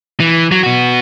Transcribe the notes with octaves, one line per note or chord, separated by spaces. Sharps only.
E3
F#3
B3 F#4